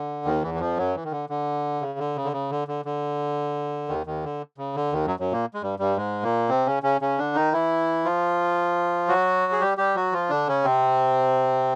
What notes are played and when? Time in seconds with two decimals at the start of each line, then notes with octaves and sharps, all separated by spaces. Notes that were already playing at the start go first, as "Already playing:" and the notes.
Already playing: D3
0.25 D#2 D#3
0.43 E2 E3
0.54 E3
0.60 F2 F3
0.77 F#2 F#3
0.95 E3
1.04 D#3
1.12 D3
1.29 D3
1.81 C#3
1.99 D3
2.16 C#3
2.24 D3
2.33 C#3
2.51 D3
2.68 D3
2.85 D3
3.88 D#2 D#3
4.06 D#2 D#3
4.24 D3
4.58 C#3
4.76 D3
4.92 D#2 D#3
5.06 F#2 F#3
5.20 F#2 F#3
5.31 A#2 A#3
5.54 G#3
5.62 G2 G3
5.79 G2 G3
5.97 G#2 G#3
6.23 A#2 A#3
6.49 C3 C4
6.66 C#3 C#4
6.83 C#3 C#4
7.01 C#3 C#4
7.18 D3 D4
7.35 D#3 D#4
7.52 E3 E4
8.05 F3 F4
9.08 F#3 F#4
9.52 G#4
9.61 G3 G4
9.77 G3 G4
9.95 F#3 F#4
10.12 F3 F4
10.30 D3 D4
10.48 C#3 C#4
10.64 C3 C4